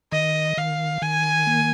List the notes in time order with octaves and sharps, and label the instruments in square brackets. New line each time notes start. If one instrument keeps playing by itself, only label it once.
[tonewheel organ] D#3 [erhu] D#5
[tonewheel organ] D#3 [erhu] F5
[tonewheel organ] D#3 [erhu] G#5
[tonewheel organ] A#3